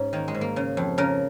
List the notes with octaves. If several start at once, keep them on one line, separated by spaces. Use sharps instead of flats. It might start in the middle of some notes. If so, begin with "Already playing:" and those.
Already playing: G#2 C#4
D#3 A#3
G#3
G#2
A#3
C#3
F2
C#3 A#4